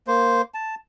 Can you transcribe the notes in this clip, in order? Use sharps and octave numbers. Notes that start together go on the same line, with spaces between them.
A#3 C5
A5